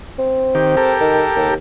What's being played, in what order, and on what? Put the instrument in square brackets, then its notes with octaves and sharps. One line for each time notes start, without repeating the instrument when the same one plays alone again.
[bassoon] C4
[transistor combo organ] D#3 G4
G4 A4 A#4
[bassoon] D#3
D#2